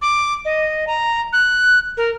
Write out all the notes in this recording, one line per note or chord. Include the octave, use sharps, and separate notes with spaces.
D6
D#5
A#5
F#6
A#4